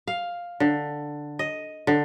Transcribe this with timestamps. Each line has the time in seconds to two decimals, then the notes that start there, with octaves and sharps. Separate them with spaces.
0.08 F5
0.60 D3
1.39 D#5
1.87 D3